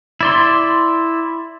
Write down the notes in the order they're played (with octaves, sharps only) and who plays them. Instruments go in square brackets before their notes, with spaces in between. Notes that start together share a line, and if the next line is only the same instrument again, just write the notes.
[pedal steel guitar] E4 D5 C6